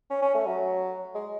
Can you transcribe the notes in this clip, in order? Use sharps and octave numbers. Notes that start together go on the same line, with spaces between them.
C#4
C#4
A3
F#3
G#3